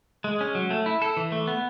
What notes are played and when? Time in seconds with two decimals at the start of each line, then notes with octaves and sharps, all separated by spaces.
0.24 G#3
0.41 C#4
0.55 F#3
0.71 A3
0.86 E4
1.02 A4
1.17 E3
1.32 A3
1.47 B3